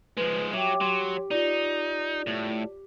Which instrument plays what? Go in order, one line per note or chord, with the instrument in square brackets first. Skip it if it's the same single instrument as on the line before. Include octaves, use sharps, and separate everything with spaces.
[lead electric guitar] F3 G#3 [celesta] B4
[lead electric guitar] F#3 [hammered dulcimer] G4 [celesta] E5
[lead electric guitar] F#3 [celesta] C6
[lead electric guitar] D#4 [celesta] F4 D5
[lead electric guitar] A2